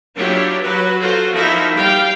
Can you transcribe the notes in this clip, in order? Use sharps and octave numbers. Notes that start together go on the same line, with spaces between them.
F#3 D4 E4 F4 G4 C#5
F#3 F#4 B4
F4 F#4 A4 C5
F3 D#4 E4 F#4 A#4 E5
G3 F5 G5